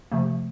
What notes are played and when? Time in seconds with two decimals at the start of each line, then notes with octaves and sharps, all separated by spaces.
0.11 C3 F3 A3